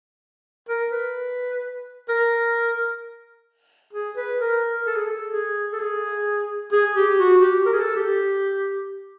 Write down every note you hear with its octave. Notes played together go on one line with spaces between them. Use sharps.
A#4
B4
A#4
G#4
B4
A#4
A4
G#4
A4
G#4
A4
G#4
G#4
G4
F#4
G4
A#4
G#4
A4
G4